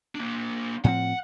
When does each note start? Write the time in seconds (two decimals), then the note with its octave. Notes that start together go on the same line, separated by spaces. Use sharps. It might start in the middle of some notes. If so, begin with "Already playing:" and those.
0.15 A#3 D4
0.84 A2 F3 C4 F#5